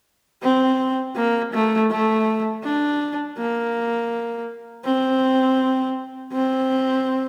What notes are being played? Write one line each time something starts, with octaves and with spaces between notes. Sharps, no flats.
C4
A#3
A3
A3
D4
A#3
C4
C4